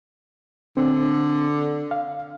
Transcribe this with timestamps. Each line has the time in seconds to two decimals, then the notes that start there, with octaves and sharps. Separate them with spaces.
0.77 D3 C4
1.91 F5